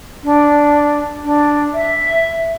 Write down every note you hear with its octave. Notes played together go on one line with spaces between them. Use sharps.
D4
D4
E5